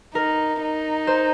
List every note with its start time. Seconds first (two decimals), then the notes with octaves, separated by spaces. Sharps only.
0.15 D#4 A#4
0.62 D#4
1.07 C5